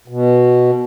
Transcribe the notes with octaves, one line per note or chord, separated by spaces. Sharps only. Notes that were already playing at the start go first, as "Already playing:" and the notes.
B2